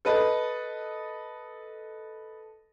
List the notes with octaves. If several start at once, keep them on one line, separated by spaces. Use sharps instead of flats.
A4 B4 D#5